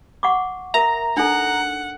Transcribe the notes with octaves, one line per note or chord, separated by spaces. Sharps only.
F#5 C#6 D6
A#4 E5 A#5
D4 D#4 A4 F#5